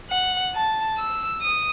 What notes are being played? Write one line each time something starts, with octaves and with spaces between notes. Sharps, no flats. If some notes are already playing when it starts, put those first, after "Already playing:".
F#5
A5
E6
D#6